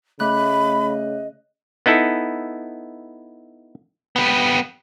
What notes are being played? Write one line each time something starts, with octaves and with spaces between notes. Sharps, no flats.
C#3 A3 D#5 B5 F#6
B3 D#4 E4 A4
G3 B3